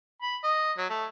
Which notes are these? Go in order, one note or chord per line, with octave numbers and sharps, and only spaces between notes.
B5
D#5
F#3
A3